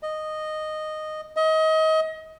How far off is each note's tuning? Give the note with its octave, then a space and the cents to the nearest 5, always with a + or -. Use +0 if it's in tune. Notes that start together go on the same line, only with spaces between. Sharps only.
D#5 -10
D#5 +30